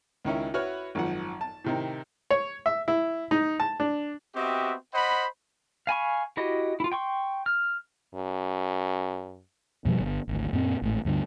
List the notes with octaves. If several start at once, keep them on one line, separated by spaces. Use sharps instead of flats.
C#2 D#3 C#4 E4
E4 F#4 B4 C#5 F#5 F6
G#1 F#2 F3 F#5
A5
A2 C3 D#3
C#5
E5
E4
D#4
A5
D4
B3 C4 F#4 G4 D#5 E5
C5 D#5 F#5 B5
F5 G#5 B5 C#6
E4 F#4 G4 D#5
E4 F4
G5 C6 C#6
F6
F#2
F2 B2 F3 G3
G1
G#1 D2
F#2 A#2 C4
G#1 A2
D2 G2 B2 D3